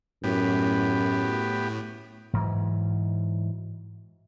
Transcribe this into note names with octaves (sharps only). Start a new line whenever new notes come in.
F#2 A2 B3 G4
G#2 E3 F#3